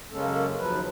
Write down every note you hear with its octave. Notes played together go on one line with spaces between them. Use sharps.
F#2 C#3 G#3 A#3 C#4 A4
D#2 F3 F#3 B4